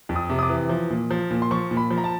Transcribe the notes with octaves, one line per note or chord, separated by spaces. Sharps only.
F2
D#6
C3
D#6
D6
E3
F3
A#2
F3
A#2
C6
F3 C#6
A#2
B5
F3
A#5
A5